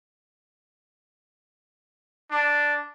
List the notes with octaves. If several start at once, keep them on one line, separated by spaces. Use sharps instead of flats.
D4